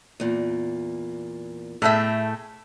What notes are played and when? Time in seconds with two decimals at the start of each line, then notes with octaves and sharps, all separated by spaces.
0.20 E2 A#2
1.82 A2 A3 G#4 E5 G5